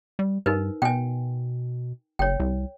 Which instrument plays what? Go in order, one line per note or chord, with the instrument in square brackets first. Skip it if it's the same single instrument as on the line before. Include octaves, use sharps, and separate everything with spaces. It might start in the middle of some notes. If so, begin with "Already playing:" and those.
[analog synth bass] G3
[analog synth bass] G2 [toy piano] D#4 A#4 B4
[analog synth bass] B2 [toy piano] G5 G#5
[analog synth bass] F#1 [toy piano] C#5 G5
[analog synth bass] C2